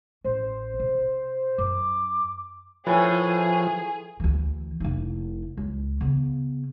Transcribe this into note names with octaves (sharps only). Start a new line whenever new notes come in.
A1 C#4 C5
C3
F#2 D6
A2 F3 G#4 B4
D2 E3
F1 E4
C#2
C#3 B3